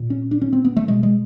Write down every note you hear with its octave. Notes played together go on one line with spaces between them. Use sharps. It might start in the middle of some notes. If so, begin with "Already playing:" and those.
Already playing: A#2
C#4
D4
C#4
C4
B3
A3
B2 G#3
G#3